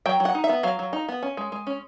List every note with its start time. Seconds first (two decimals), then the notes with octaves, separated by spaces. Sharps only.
0.06 F#3 G5
0.20 F#3
0.25 F#5
0.35 D#4
0.44 E5
0.49 B3
0.63 F#3 F5
0.79 F#3
0.93 D#4
1.09 B3
1.23 C#4
1.37 G#3
1.52 G#3
1.67 C#4